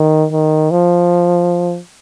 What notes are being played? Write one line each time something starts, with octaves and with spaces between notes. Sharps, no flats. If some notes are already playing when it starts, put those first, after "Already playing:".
Already playing: D#3
D#3
F3